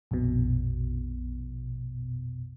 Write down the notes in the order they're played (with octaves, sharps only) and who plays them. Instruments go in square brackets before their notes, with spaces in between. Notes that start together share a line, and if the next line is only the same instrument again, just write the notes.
[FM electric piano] A#1 F2 B2